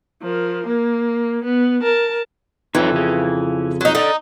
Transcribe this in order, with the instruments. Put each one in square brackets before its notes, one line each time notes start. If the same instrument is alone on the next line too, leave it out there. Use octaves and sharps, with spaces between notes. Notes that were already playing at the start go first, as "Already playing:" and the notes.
[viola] F3 A#4
A#3
B3
A#4 A5
[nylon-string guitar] F2 [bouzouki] E3 [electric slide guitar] D#4 A4 C#5
[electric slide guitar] C#3 G#4
[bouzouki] F#3 D#4
[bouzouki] D#4 [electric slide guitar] A4 D5